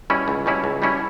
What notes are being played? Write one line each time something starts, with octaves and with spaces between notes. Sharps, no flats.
B2 G3 C#4 E4
C#2
B2 G3 C#4 E4
C#2
B2 G3 C#4 E4